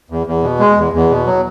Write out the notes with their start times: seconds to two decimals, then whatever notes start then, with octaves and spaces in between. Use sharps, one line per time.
0.10 E2
0.27 E2
0.43 B2
0.60 G#3
0.77 E2
0.93 E2
1.10 B2
1.26 F#3